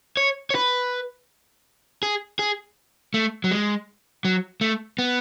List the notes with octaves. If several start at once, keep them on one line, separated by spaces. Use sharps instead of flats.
C#5
C#5
B4
G#4
G#4
A3
F#3
G#3
F#3
A3
B3